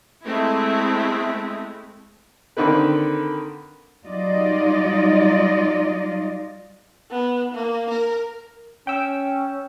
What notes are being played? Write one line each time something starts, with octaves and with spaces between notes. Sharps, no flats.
G#3 A3 C4 E4
D3 D#3 C4 B4
F#3 G3 D#4 F4 D5 D#5
B3
A#3
A#4
C#4 G5 E6